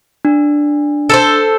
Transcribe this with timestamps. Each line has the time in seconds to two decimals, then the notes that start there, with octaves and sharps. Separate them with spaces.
0.25 D4
1.09 A4 B4 C5